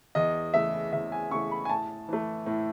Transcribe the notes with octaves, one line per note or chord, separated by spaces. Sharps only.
E2 D#5
C#3 E3 A3 E5
E2 E5
G#5
C#3 E3 A3 C#6
B5
G#5
A2 A5
E3 A3
A2